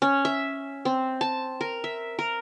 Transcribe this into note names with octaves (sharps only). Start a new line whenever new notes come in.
C#4
E5
C4
A5
A#4
E5
A#4